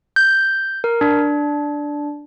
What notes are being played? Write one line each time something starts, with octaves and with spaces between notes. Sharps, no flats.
G6
A#4
D4